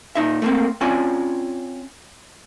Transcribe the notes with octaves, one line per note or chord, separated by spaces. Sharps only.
A#2 D#4 E5
A3 A#3 C4
C4 C#4 F4 D5 G#5